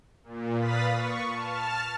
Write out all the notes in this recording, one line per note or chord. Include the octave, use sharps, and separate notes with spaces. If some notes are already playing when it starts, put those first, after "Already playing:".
A#2
B4 F5 B5 D#6 A6 B6
C#6
A5 F6